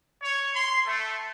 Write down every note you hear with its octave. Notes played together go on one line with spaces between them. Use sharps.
C#5
C6
A3